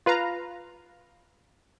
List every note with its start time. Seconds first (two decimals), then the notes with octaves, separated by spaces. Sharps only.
0.06 F4 B4 F5 A#5